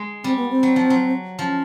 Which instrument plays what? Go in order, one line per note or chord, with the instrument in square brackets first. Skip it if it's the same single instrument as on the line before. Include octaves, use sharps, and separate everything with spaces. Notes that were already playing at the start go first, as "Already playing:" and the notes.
Already playing: [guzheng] G#3
[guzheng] G3 [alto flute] C4
[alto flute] B3
C4
[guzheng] F#3
F3
F#3
[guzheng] F3 [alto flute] C#4